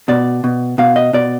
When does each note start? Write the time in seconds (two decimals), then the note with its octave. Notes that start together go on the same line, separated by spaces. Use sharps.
0.08 B2 D5
0.44 B2
0.78 B2 F5
0.96 D#5
1.13 B2 D5